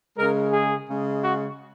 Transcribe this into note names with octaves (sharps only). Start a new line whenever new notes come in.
C#3 G#3 A#4
G#4
C#3 G#3
F#4